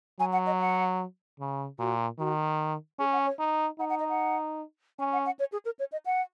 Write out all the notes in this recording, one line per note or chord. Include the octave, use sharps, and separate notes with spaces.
F#3 G#5
F#5
D#5
F#5
C#3
A#2 F#4
D#3 F#4
C#4 G#4
F#5
C#5
D#4
D#4 F#5
F#5
D#5
F#5
C#4 G#5
F#5
F#5
C#5
G#4
A#4
C#5
D#5
F#5